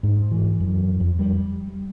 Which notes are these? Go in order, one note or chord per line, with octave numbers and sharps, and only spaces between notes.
G#2
E3
F#2
F2
G3